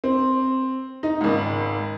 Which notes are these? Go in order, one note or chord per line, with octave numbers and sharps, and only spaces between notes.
C4
D#4
G#1 C#2